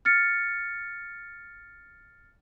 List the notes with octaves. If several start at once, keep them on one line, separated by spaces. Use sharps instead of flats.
F6 A6 C#7